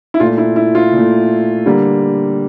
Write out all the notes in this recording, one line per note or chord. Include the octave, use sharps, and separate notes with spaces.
E4
A#2 A3 F4
E4
E4
F4
A#2 A3
D3 G3 A#3